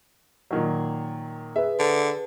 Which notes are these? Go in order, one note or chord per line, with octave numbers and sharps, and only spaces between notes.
A#2 D#3 F#3
G#4 B4 E5
D3